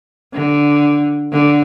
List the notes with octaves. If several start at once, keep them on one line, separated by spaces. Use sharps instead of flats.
D3
D3